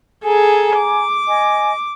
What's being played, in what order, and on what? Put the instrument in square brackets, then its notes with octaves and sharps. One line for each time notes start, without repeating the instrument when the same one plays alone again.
[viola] G#4 A4 [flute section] G#5 A#5
[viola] D6
[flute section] D#5 G#5